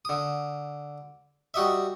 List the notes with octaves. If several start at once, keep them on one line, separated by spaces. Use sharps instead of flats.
D3 D#6
G3 F#4 D#5 E5